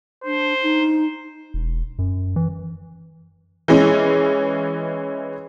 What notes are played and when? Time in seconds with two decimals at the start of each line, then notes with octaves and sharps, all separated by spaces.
0.24 D4 C5
0.62 D#4
1.54 E1
1.99 F#2
2.36 E3
3.68 E3 G#3 C#4